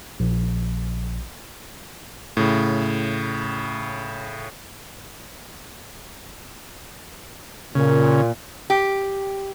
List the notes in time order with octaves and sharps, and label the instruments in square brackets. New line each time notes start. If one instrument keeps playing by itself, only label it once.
[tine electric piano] A#1
[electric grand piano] A2 C#3
[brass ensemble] A#2 [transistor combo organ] C#3
[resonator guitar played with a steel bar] G4